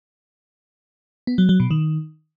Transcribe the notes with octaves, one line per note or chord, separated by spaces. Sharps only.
B3
F#3
F#3
B2
D#3